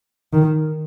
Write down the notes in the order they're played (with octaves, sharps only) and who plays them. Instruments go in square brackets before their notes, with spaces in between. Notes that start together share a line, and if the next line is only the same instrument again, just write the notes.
[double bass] D#3